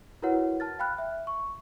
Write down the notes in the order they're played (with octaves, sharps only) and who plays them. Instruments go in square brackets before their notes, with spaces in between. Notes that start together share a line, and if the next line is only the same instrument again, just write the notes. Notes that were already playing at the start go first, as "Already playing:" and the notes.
[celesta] E4 F#4 A#4 B4 C#5 F#5
A5 F6 A6
F5 G5 B5 F6 F#6
E5
C#6